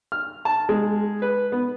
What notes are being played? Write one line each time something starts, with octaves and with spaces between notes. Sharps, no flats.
F6
A5
G#3
B4
B3